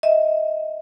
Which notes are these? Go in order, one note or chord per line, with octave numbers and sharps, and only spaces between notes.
D#5 E5